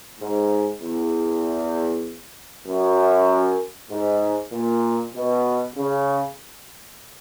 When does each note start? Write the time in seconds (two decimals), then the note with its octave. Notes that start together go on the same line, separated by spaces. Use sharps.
0.21 G#2
0.82 E2
2.68 F#2
3.91 G#2
4.53 A#2
5.15 B2
5.76 C#3